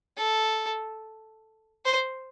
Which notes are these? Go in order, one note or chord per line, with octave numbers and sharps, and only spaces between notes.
A4
C5